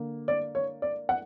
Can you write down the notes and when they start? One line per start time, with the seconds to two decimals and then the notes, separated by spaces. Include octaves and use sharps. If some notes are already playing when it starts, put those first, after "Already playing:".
Already playing: D3 A#3
0.28 D5
0.55 C#5
0.82 D5
1.09 F#5